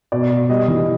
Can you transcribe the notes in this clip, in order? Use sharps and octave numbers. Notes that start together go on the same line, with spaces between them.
B2 D5
B2
G3 D#5
E3